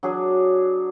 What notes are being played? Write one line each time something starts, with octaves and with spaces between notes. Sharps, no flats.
F#3 D4 G#4